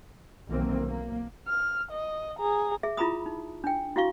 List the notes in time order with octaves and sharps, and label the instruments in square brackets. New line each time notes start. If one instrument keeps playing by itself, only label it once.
[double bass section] B1 D#3 E3 A#3 C4
A#3
[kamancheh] F6
D#5
G#4 A#5
[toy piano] G#4 E5
E4 F4 G#4 A#5 B5 D#6
D#4
D4 G5
E4 F#4 F5 C#6